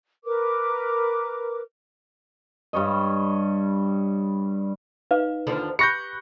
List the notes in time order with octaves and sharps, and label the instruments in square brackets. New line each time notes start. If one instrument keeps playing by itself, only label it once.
[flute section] A#4 B4 D6
[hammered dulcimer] G2 G3 C#5 D#5
[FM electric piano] D#4 [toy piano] B4 F5
[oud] D#2 D3 F3
[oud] G4 [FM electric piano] B5 C#6 F#6 [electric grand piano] G6 A#6 C#7